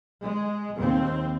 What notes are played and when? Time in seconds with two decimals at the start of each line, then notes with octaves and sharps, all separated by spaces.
0.21 G#3
0.78 D#2 C4